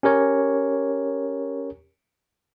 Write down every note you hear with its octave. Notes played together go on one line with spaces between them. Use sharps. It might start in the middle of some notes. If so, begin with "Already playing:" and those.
C#4 G4 A#4 C#5